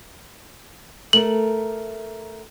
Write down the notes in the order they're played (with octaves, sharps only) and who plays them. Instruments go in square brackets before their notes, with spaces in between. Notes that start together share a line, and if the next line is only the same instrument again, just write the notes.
[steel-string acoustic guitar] A3 A#4 [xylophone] F#7